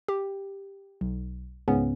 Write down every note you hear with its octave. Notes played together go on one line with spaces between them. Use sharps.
G4
B1
C#2 G#2 C#3 B3 C#4